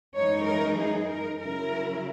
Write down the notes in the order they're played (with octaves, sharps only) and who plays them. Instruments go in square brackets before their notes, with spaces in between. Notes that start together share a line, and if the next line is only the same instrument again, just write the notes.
[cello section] F#2 E3 G#3 D#4 C#5
A#4
G#4
A#4
C#3 F#3 C#4 E4 A#4